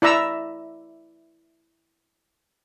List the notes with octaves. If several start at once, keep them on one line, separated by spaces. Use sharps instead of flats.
E4 D5 E5 A#5 E6